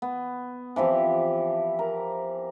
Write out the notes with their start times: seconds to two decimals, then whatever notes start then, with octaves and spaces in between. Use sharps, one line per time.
0.02 B3
0.76 E3 F3 C4 G4
1.79 A#4